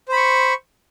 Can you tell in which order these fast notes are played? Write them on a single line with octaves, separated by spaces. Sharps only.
C5 B5 C#6